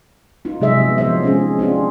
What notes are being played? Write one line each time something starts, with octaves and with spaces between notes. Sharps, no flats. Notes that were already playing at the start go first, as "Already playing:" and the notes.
D#4 F4
C3 F#3 G#3 G#4 D#5 E5
F3 B3
F3 C5 C#5 D#5 E5
G#3 C4 C#4 D#4 F4 G#4
C4 D4 F4 G#4